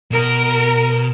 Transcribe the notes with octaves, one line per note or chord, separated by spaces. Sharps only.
B2 A#4